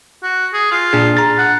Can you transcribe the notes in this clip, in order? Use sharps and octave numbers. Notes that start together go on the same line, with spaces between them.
F#4
G#4
F4
A#2 D4 G#4
A#5 A6
F#5